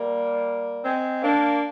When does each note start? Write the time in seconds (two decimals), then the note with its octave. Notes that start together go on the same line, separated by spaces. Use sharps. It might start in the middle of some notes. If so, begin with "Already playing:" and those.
Already playing: G3 A#3
0.83 G#3 C4
1.22 A#3 D4